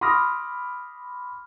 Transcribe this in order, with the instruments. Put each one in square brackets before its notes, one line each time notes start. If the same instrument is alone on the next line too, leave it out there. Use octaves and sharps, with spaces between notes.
[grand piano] B5 C6 D6 D#6 F6 A#6